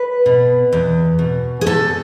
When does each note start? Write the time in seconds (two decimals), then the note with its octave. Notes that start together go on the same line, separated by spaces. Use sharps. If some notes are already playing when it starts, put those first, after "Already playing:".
Already playing: B4
0.26 B2
0.72 E2
1.19 B2
1.61 G#4
1.66 E2 A4